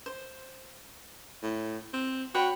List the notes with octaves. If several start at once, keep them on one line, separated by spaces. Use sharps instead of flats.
C5
A2
C4
F#4 C#5 G5 B5